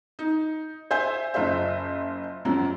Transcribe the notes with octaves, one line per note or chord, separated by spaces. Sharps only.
D#4
C5 E5 G#5 G6
F#1 F4 C5 E5
F#2 F3 F#3 G#3